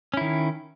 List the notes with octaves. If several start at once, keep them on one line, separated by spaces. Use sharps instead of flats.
D#3 C#4 E4